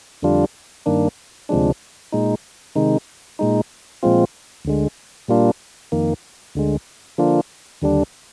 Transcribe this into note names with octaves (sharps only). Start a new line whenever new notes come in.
F2 D3 G3 D4 F4
G2 D#3 A#3 D4
D2 C3 F3 G#3 D4
A#2 G#3 D#4
C3 D#3 G#3 D#4
A#2 G#3 D#4
A#2 F3 G#3 C4 F4
D2 D3 G#3
A#2 G3 A#3 D4 F4
F2 D#3 A#3
D2 D3 G#3
D3 F3 A#3 D4 F4
D#2 D3 G3 D4